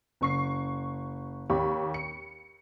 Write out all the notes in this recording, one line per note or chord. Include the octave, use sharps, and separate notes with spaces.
F#1 C#6 C7
D#2 G4 C#5 B5 C#6
C#7